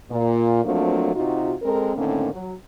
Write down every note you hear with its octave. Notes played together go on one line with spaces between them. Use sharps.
A#2
F3 F#3 A3 A#3 C4 D4
C3 D#4 F4 F#4
G#3 C4 A4 A#4
A2 D3 D#3 A#3 C4 C#4
F#3